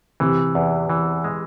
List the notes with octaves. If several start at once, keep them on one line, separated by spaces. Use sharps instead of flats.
C3 E3
E2
E3
G#3